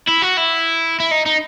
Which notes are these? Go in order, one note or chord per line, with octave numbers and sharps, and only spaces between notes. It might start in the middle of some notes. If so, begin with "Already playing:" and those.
E4
F#4
E4
E4
D#4
D#4